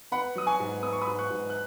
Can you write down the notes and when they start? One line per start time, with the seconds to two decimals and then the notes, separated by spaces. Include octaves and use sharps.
0.12 B3 F#5 B5
0.36 F#3 D#6
0.47 G#5 C#6
0.60 G#2
0.82 B3 D#6
0.93 C#6
1.01 B5 D#6
1.07 G#2
1.19 C#6 F#6
1.30 G#2
1.50 F#6